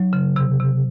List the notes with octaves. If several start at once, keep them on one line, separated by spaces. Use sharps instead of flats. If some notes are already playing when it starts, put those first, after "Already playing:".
Already playing: F#3 D#4
C#3
C3
C3